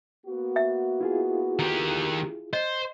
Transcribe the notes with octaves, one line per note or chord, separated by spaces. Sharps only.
A#3 B3 F#4
E5
E4 F4 G#4
D#3 G4
C5 D#5